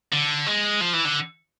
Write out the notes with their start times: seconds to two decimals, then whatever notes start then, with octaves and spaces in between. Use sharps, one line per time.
0.13 D3
0.47 G#3
0.81 F3
0.93 E3
1.05 D3